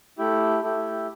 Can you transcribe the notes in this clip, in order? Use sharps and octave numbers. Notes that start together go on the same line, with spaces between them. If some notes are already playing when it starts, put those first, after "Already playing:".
A3 E4 G4
A3 E4 G4